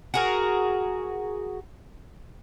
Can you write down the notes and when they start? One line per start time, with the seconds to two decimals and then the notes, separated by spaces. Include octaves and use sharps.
0.14 F#4 G#4 A#4